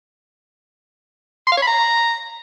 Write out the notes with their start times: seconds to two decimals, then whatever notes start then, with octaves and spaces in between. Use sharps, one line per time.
1.47 C6
1.52 F5
1.57 C#5
1.62 B5
1.67 A#5